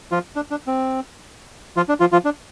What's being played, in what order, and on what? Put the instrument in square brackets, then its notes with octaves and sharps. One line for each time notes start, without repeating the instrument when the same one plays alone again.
[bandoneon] F3 F4
D4
D4
C4
F3 F4
D4
F3 F4
F3 F4
D4